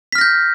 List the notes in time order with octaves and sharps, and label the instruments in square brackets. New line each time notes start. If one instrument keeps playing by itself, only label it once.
[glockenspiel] B6
F6
A#6
G6